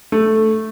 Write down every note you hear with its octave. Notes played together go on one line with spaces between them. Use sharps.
A3